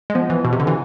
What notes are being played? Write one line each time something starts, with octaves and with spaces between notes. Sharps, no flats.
G#3
F3 B3
E3
B2
C3
D3
E3